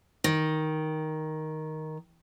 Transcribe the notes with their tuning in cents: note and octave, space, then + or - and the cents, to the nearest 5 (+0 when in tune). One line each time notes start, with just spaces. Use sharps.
D#3 +5